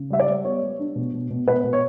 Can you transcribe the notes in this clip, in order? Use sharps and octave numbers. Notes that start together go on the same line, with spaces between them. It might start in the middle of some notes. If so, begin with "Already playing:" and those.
Already playing: C#3
G3 E5
D5
G3
B3 C#5
G3
D4
B2
B2
B2
B2 B4
B2
C#5